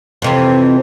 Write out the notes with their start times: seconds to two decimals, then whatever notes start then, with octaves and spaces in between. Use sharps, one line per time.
0.22 F2 C3 E3